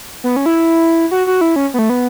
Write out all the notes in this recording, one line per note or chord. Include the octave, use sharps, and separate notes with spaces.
B3
C#4
E4
F#4
F#4
E4
C#4
B3
A3
B3